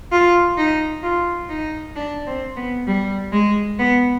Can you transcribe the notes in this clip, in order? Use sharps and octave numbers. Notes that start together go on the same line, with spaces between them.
F4
D#4
F4
D#4
D4
C4
B3
G3
G#3
B3